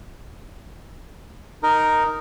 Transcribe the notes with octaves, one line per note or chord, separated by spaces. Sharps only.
D#4 A#4